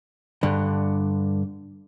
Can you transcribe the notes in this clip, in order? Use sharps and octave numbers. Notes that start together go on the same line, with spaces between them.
G2 D3